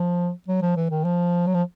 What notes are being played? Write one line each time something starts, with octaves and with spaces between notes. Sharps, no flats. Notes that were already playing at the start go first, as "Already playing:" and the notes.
Already playing: F3
F#3
F3
E3
D#3
F3
F#3
F3